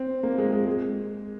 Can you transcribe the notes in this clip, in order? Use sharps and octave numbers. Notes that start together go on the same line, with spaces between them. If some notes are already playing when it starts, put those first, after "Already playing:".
Already playing: C4
A#3
G#3
G#3
G#3